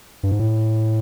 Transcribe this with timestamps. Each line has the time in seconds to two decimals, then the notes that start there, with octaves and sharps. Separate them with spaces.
0.23 G2
0.32 G#2
0.39 A2